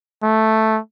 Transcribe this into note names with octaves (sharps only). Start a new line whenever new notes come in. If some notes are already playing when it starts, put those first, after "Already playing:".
A3